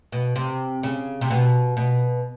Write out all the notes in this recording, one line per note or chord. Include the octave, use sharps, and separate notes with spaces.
B2
C3
C#3
C3
B2
B2